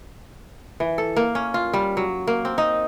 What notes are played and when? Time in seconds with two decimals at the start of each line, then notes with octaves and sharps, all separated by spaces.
0.80 E3
0.98 A4
1.17 A#3
1.35 C#4
1.54 F4
1.74 G3
1.97 F#3
2.27 A#3
2.45 C4
2.58 D#4